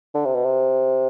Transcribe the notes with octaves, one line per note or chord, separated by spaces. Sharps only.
D3
C3
B2
C3